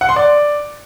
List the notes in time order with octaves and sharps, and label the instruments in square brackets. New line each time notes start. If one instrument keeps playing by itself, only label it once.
[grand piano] F#5
C6
D5